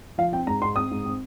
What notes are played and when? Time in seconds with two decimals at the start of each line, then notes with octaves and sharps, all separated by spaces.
0.18 F3 F5
0.32 C4 G5
0.47 G#2 A#5
0.61 G#2 C6
0.76 C4 D#6
0.91 G#2
1.05 C4